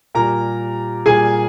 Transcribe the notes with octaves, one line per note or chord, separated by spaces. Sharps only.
A#2 G3 A#4 A#5
A#2 G3 G#4 G#5